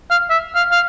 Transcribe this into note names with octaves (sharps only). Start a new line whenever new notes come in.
F5
E5
F5
F5